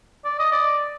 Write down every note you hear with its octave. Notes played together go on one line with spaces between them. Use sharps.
D5
D#5
D5